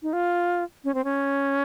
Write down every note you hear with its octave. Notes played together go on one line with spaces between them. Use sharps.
D#4
F4
C#4
C4
C#4